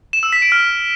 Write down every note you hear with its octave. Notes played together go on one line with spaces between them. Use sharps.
E7
E6
B6
D7
F6